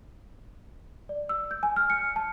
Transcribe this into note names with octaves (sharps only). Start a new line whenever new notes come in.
D5
E6
G6
G#5
F6
C#7
A5